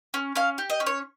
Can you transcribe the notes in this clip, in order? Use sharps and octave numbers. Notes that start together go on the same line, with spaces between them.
C#4
C#4 F5
G4
D#5
C#4
C#5